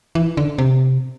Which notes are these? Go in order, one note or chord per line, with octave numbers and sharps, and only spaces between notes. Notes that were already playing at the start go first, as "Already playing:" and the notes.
E3
D3
C3